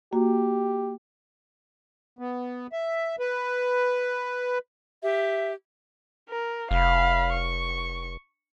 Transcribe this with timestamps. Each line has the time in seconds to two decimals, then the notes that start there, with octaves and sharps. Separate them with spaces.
0.13 A#3 F#4 G4
2.19 B3
2.72 E5
3.19 B4
5.03 G4 E5
6.29 A#4
6.71 F1 F5 B5
7.32 C#6